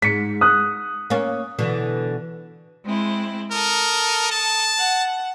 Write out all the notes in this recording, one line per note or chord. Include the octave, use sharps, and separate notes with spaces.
G#2 B6 C#7
D#6 F#6
A#3 C#4
B2 D3 E3
G#3 C4 E4
A4 A#4 D#6
A5
F#5